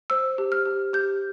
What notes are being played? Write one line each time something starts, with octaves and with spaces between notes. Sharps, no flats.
C5 E6
G4
F6
G4
G4 G6